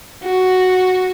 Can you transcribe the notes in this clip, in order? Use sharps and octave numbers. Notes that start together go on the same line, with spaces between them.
F#4